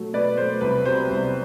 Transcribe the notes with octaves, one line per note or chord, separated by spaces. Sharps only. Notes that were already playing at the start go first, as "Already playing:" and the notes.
Already playing: B2 F#3 A3
B2 B4 D5
F#3 A3 C5
C2 B4
C3 F#3 B3 C5
C2